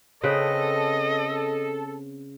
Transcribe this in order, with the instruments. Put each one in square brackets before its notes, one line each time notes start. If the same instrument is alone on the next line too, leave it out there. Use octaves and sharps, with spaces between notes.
[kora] C#3 C4 B4 [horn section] A4 [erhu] D#5